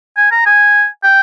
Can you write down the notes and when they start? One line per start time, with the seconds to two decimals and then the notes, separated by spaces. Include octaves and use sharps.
0.17 G#5
0.31 A#5
0.46 G#5
1.04 G5